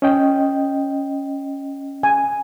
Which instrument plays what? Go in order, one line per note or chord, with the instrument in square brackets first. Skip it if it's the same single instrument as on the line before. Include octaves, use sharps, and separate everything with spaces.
[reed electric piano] C#4 D#5 G5
[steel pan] G#5